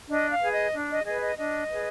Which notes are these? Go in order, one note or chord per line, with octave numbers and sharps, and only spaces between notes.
D4 D#5
F5
G#4 B4
D#5
D4
D#5
G#4 B4 D#5
D#5
D4 D#5
G#4 B4